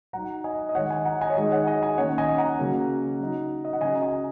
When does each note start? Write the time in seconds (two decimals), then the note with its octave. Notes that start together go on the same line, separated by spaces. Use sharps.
0.13 F#3 D#4 F#5 A#5
0.44 D#5 G#5
0.69 D#5
0.75 D#3 G#3 D#4 C#5 F#5
0.90 D#5 G#5
1.05 F#5 A#5
1.21 D#5 G#5
1.30 C#5
1.36 D#3 G#3 D#4 D#5
1.51 C#5 F#5
1.67 D#5 G#5
1.82 D#5 G#5
1.98 D#3 A#3 C#4 C#5 F#5
2.18 D#5 G#5
2.38 F#5 A#5
2.59 C#3 F#3 A#3 C#4
3.20 F#3 D#4
3.65 D#5
3.73 F#5
3.81 C#3 F#3 C#4 D#5 G#5
3.95 A#5
4.02 D#5 G#5